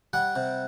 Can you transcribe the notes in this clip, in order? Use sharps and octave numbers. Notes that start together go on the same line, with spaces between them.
G3 F#5
C3